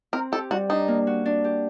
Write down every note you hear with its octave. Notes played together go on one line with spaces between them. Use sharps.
C4 A#4
G4 A4
G3 F#4
D4 D#4
A#3
F#4
D4
G4